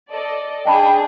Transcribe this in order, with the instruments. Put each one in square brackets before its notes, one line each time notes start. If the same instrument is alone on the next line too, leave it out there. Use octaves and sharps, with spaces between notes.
[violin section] A4 D5 D#5
[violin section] D4 G#4 [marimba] D#5 A5 B5 [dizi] G5